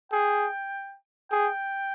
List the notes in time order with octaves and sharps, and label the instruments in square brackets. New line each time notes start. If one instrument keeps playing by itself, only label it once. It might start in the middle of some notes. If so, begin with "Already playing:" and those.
[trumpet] G#4 [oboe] G5
[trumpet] G#4 [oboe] G5